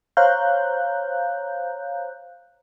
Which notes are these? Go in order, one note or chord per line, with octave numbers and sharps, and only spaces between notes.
C5 C#5 F5 A#5 F#6 G6